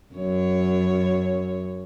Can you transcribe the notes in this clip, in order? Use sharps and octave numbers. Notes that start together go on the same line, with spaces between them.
F#2 C#5